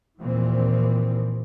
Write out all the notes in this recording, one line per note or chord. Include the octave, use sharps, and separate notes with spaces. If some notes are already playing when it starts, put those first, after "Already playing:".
D#2 A#2 E3 F3 C4